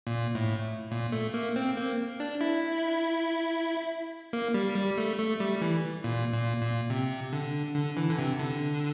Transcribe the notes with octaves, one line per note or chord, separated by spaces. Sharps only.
A#2
A2
A#2
A3
A#3
C4
A#3
D4
E4
A#3
G3
G3
A3
A3
G3
E3
A#2
A#2
A#2
C3
D3
D3
E3
D3
C3
D3